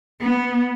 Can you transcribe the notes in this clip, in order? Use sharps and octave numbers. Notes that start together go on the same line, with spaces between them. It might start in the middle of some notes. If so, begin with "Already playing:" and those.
B3